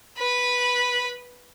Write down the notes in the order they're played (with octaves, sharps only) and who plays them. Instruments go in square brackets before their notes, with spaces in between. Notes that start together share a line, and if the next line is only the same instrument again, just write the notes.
[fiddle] B4 B5